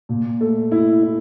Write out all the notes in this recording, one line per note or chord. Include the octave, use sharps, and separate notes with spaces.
A#2
A3
E4
E4